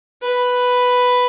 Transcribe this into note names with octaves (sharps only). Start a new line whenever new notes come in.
B4